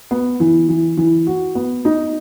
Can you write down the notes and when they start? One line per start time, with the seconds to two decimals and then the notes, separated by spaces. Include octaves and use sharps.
0.11 B3
0.40 E3
0.69 E3
0.97 E3
1.27 F#4
1.55 B3
1.85 D#4